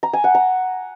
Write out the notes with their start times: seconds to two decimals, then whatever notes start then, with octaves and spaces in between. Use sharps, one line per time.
0.03 A#5
0.13 G#5
0.24 F#5
0.35 A#5